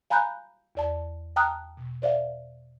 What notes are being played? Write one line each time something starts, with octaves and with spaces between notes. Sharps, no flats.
F5 G#5 A#5 B5 F#6 G6
E2 D5 A5
G5 A5 A#5 D#6 F6 F#6
B2
C5 D5 E5 F5